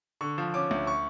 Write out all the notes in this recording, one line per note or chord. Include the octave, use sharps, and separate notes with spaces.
D3 C#6
F3
C#4 D6
D2
C#6